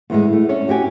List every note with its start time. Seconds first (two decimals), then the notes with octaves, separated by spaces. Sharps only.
0.10 E2 A2 G#3
0.33 A3
0.49 C#4 D4 A4 C#5
0.68 A2 F#4 G4 G#5